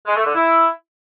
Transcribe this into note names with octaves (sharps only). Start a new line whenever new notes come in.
G#3
A3
D3
E4